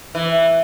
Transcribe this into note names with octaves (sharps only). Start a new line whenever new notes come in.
E3